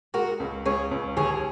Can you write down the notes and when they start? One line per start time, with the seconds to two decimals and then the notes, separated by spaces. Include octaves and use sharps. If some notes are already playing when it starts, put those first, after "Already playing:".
0.14 G#3 F#4 A#4
0.40 C#2
0.65 C#2 G#4 C#5
0.91 C#2
1.17 D#2 G#4 C#5